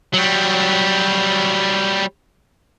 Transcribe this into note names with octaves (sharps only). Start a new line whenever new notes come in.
F#3 G3